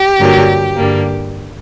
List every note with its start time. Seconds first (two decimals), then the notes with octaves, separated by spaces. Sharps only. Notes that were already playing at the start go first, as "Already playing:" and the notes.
Already playing: G4
0.18 G2 D3 F#3 A#3
0.76 G2 D3 G3 A#3